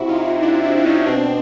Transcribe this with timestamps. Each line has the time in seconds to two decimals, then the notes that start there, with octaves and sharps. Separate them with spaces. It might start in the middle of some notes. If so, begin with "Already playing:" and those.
Already playing: C3 E4 F#4
0.09 D#4 F4
0.43 D4 E4
0.64 D4 E4
0.78 D4
0.86 C#4 D#4
1.07 B2 C4 D4
1.23 C4